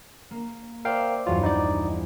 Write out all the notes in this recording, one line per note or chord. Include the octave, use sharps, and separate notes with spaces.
A#3
A#4 C5 D5 E5 F5 G5
A#1 E2 G2 F#3 F4
D#4 D5 G6